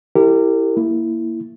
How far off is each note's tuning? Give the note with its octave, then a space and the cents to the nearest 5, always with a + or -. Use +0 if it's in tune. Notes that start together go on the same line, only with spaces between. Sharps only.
E4 +0 G4 +0 A#4 -30
A#3 +0 E4 +0